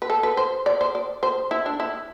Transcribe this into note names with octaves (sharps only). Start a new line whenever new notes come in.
B4
A4
B4
C5
D5
C5
D5
C5
E4
D4
E4